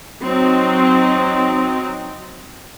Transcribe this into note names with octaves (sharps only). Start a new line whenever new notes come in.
F#3 C4 D#4